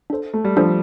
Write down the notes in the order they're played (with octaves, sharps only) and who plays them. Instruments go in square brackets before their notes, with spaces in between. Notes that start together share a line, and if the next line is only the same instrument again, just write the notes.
[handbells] D4 A4 C5
[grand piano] A3
G3
[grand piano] F3 [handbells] D4 A4 C5